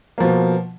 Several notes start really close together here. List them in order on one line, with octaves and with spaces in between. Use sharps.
A#3 F3 B2